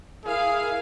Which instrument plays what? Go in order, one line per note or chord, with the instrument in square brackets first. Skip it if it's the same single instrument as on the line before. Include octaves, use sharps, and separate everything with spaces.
[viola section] E4 F5 [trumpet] G#4 [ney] A#4